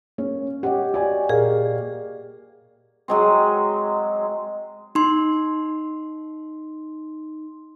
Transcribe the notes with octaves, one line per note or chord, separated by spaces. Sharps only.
A#3 C#4
G4 C#5 D#5 F#5
F#4 D5 G#5
A#2 G#4 A#4 D5 F5
F#3 G#3 C4
D#4 C6